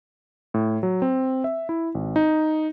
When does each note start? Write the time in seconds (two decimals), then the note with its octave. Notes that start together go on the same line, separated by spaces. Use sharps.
0.54 A2
0.83 F#3
1.02 C4
1.44 E5
1.69 E4
1.95 G#1
2.16 D#4